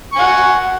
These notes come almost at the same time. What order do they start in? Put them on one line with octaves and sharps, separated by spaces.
C#6 G#5 F#5